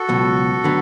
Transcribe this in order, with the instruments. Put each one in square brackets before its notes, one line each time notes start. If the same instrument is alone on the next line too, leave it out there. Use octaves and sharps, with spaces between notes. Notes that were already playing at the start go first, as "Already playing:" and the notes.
Already playing: [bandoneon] F#4 A4
[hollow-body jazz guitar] C#2 B2 F#3
D3 F#3 B3